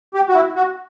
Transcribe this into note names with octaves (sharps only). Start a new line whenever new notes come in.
G4
F#4
E4
F#4